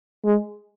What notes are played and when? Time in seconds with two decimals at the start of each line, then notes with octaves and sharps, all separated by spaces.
0.25 G#3